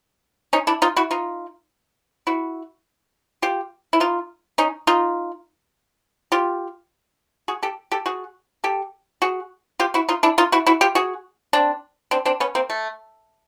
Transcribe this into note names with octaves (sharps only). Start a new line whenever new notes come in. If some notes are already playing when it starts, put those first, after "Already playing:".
C#4 D#4
D4 E4
D#4 F4
E4 F#4
D#4 F4
E4 F#4
F4 G4
E4
D#4 F4
C#4 D#4
D#4 F4
F4 G4
F#4 G#4
G4 A4
G4 A4
F#4 G#4
G4 A4
F#4 G#4
F4 G4
E4 F#4
D#4 F4
D4 E4
D#4 F4
E4 F#4
E4 F#4
F4 G4
F#4 G#4
C4 D4
C4 D4
C4 D4
B3 C#4
A#3 C4
A3